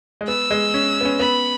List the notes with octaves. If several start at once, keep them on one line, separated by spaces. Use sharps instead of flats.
G#3
B3 E6
G#3
C#4
B3
C#4
B3 B5